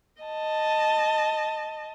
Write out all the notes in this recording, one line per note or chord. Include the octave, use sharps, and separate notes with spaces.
D#5 A5